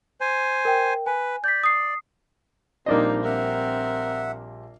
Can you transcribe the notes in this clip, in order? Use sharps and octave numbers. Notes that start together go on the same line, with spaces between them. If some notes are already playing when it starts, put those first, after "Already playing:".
C5 G#5
A#4 G5
B4 G#5
D5 G6 B6
D#6 C7
A#1 G3 A#3 C4 D4 D#4 C5 D#5
C4 A#4 E5 F#5